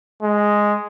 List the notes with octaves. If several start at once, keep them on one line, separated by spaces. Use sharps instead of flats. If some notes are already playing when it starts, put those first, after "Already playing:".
G#3